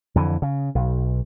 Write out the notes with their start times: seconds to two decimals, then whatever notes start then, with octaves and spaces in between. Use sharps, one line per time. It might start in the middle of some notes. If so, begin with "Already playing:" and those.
0.15 F2 D3 E3
0.42 C#3
0.75 B1